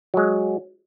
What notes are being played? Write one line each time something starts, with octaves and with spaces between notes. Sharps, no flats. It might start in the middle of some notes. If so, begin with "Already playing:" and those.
F#3 G#3